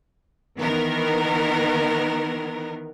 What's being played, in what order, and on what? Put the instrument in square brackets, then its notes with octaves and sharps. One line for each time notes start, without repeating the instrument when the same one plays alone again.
[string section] D#3 E3 B3 A#4